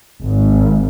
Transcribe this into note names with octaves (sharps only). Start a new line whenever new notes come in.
G#1